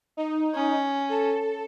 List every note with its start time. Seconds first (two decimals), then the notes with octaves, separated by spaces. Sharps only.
0.17 D#4
0.55 C#4
1.09 A4